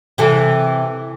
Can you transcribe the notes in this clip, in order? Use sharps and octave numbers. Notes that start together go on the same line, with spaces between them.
C3 E3 A4